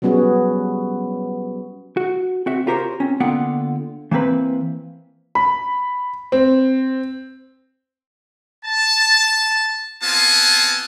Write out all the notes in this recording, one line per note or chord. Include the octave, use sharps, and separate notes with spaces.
F#3 G3 B3 C#4 F#4 G#4
F#4
C4 F#4 E5
F4 G4 A#4 C5 C#5
C4 C#4
D3 A#3 B3 F4 F#5 G5
E3 A#3 C4 B4 B5
B5
C4
A5
B3 C4 F4 G#5 A5